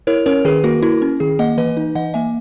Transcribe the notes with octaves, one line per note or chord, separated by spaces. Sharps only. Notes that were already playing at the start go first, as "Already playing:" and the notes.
E4 A#4 C#5
C#4 A#4 C#5
D#3 G#4 B4
A#3 F#4 A#4
E4 F#4 A#4
C#4
D#3 G#4
A#3 D#5 F#5
E3 B4 D#5
D#4
E3 D#5 F#5
A#3 E5 G#5